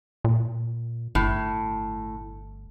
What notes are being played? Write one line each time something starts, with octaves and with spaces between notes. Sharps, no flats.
A#2
G1 A2